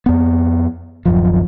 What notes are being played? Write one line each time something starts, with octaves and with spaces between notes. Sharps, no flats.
F2 B3
D1 F#2 F3